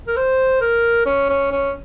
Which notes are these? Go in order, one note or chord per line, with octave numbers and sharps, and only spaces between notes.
A#4
C5
A#4
C#4
C#4
C#4